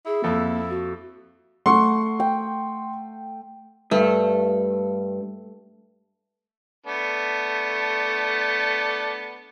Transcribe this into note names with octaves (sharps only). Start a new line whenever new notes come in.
E4 G#4
F2 A#3 A4
F#4
A3 F#5 C6 C#6
G5
G2 A3
A3 B3 D4